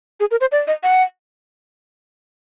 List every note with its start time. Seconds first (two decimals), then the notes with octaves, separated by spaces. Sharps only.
0.20 G#4
0.31 A#4
0.41 C5
0.52 D5
0.68 D#5
0.83 F#5